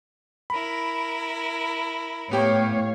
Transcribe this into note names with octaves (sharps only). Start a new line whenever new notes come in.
E4 A#4 B5
A2 B3 G4 C#5 F5 G5